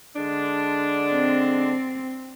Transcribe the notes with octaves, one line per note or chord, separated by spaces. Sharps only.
D3 G#3 D4
C4